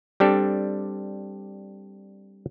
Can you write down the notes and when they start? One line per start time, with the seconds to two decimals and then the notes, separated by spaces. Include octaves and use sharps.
0.20 G3 C4 D4 G4 A4